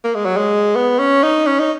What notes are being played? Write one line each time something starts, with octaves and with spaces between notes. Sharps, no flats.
A#3
G#3
F#3
G#3
B3
C#4
D#4
C#4
D#4